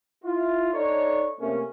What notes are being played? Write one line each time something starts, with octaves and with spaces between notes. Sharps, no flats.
E4 F4
D4 D#4 A4 C#5
C3 A3 A#3 C#4